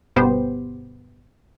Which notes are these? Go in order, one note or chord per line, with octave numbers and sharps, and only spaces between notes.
G1 B2 B3 G4 C5